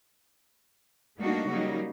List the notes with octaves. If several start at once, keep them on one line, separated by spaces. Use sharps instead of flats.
G3 A3 A#3 D4 D#4 F#4
C#3 F#3 G3 A#3 D#4